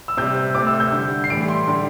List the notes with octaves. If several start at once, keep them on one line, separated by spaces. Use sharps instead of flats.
E6
C3 G3 G6
C3 A3 D6
E6
G6
D3 G3
C7
A2 E3 G3 D7
C6
D3 G3